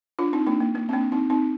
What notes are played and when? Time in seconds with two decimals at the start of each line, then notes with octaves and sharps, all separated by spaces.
0.19 D4 F4
0.33 C4 D#4
0.47 A#3 D4
0.60 A#3
0.75 A#3
0.89 C4
0.93 A#3 D4
1.12 C4 D#4
1.30 C4 D#4